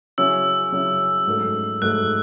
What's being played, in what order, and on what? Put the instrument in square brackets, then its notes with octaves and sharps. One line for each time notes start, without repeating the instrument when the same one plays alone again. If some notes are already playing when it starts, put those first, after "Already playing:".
[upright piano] C#3 F#3 C#4 E4 [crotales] E6
[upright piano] C#3 F#3 C#4 E4
G#2 F#3 A3
[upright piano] G#2 F#3 A3 [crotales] F#6